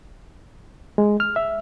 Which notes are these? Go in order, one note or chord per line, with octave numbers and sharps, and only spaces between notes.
G#3
F6
E5